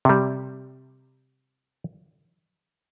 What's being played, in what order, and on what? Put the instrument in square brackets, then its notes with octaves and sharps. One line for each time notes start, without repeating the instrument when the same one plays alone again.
[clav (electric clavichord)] C3 G3